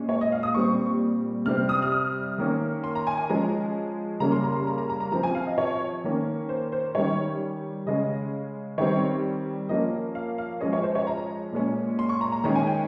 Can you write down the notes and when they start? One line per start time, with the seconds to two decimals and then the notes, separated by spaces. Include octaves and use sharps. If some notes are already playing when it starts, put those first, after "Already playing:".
Already playing: A#2 G#3 C#4
0.09 C#5
0.21 D#5
0.32 F5
0.43 D#6
0.54 A#2 G3 C4 C#6
1.46 C3 G3 C4 F6
1.69 D#6
1.82 F6
1.92 D#6
2.38 D#3 A#3 C#4
2.84 C6
2.95 A#5
3.07 G#5
3.18 G#5
3.29 F3 G#3 C#4 A#5
4.20 C#3 G3 A#3 C#4 A#5
4.32 C6
4.44 A#5
4.55 C6
4.67 A#5
4.78 A#5
4.90 A#5
5.00 A#5
5.12 F3 C4 A#5
5.23 G#5
5.35 F5
5.47 D#5
5.58 C#5
6.04 D#3 A#3 C#4
6.49 C5
6.72 C5
6.95 D#3 G3 C#4 C#5
7.86 C#3 G#3 C#4 D#5
8.78 D#3 G3 C4 C#5
9.69 F3 A#3 C#4 D#5
10.15 F5
10.38 F5
10.61 F3 G#3 C#4 D#5
10.73 C#5
10.83 C5
10.95 C#5
11.07 A#5
11.52 A#2 G#3 C#4
11.99 C6
12.09 C#6
12.21 A#5
12.32 A#5
12.44 D#3 G#3 C#4 A#5
12.55 G#5
12.67 G5